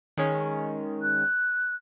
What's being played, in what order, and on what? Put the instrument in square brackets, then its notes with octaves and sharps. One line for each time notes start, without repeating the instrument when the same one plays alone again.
[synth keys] D#3 G#3 C#4
[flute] F#6